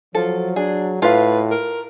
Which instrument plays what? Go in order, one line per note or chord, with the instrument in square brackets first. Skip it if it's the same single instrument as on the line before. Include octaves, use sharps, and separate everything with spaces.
[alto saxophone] F3 [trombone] F#3 [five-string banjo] A4
[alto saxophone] D4 [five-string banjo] G#4
[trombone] A2 [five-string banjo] F4 F5 [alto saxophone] B4
[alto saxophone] A#4